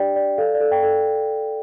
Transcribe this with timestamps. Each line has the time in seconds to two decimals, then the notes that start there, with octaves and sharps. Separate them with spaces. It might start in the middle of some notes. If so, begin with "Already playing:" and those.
Already playing: D4 G4 D5 G5
0.16 D5
0.38 A4 F5
0.54 D5
0.61 A4
0.72 G5
0.83 A4